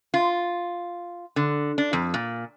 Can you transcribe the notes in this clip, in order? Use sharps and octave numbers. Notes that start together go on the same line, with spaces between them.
F4
D3
D4
F2
A#2